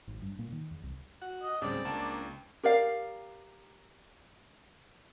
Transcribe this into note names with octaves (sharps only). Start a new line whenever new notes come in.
G#1
G2
A#2
D#3
E2
C2
F#4 F#5
D#5
D2 A2 C#3 G3 G#3 C4 D5
C#2 A#3 D4 A5 E7
G4 A#4 D5 F5